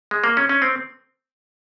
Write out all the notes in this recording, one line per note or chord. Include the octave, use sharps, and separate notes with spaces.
G#3
A#3
C#4
C#4
C4